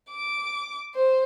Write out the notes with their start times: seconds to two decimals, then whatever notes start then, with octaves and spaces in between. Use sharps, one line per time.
0.11 D6
0.95 C5